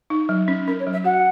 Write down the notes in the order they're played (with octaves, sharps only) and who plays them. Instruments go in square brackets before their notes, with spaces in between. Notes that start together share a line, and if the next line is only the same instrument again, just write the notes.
[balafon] D#4
F#3
C#4
[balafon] C#4 [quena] A#4
[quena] C#5
[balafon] F#3
[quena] E5
[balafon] F#4 [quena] F#5